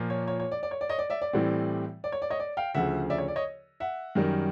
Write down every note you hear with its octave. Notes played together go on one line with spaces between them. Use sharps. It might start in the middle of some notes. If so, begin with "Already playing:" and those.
Already playing: A#2 F3 A#3
C#5
C#5
C#5
D5
D5
C#5
D5
C#5 D#5
D5
D5 E5
D5
A2 E3 G3 C4
D5
C#5
D5
C#5 D#5
D5
F5 G5
D2 C#3 F3 E5 F#5
D5 E5
C#5
D5
C#5 D#5
E5 F#5
F#2 D#3 G3